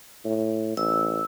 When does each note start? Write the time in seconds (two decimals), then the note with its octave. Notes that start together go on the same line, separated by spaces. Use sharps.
0.25 A2
0.77 A1 E6